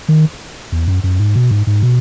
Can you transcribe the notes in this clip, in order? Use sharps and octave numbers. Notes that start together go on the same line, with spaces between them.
D#3
E2
F#2
F#2
G#2
B2
G#2
G#2
B2